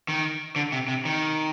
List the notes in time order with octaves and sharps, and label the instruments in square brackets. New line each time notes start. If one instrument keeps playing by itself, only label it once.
[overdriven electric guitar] D#3
D3
C3
C3
D#3